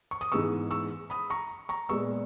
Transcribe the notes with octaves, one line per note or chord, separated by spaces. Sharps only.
C#6
D#6
G#2 E3 G#3 B3 C#6 E6
C#6 E6
B5 D#6
A#5 C#6
A#5 C#6
A#2 G#3 B3 C#6 E6